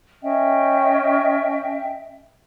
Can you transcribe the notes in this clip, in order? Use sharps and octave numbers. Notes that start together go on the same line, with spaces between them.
C#4 D#5 E5 G5